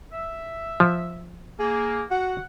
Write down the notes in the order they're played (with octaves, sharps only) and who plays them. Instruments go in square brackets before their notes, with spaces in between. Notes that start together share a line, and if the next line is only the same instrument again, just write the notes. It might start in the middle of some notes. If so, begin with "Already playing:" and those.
[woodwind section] E5
[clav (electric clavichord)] F3
[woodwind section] A#3 [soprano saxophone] G#4
[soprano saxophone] F#4 [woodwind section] F#5